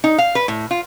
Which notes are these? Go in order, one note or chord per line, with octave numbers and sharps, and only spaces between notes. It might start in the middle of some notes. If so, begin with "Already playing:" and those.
D#4
F5
B4
A2
F4